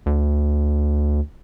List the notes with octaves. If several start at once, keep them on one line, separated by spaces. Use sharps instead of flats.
D2